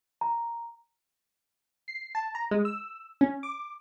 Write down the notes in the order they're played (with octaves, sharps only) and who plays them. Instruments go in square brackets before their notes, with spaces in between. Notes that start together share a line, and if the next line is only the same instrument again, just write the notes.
[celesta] A#5
[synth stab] C7
A5
A#5
G#3
E6
C#4
D6